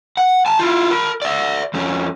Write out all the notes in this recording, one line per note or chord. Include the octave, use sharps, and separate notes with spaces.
F#5
G#5 A5
E4 F4
A#4 B5
D5 E5
F2 C#4